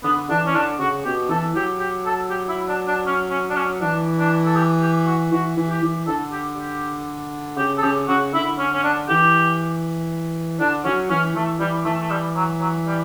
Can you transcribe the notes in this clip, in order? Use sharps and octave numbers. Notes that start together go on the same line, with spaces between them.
D3 B3
E3 D4
C#4
D3 D4
C#3 F#4
B2 G4
E3 A4
F#3 G4
G4
A4
G4
E4
D4
D4
C#4
C#4
D4
C#4
E3 D4
D4
A4
G4
G4
F#4
E3 F#4
E3
G4
E3
D3 A4
G4
G4
C#3 G4
A4
C#3 G4
C#3 F#4
D3 E4
C#4
C#4
D4
E3 G4
D3 D4
F#3 C#4
E3 C#4
E3 A3
E3 G3
E3 A3
A3
G3
F#3
F#3
G3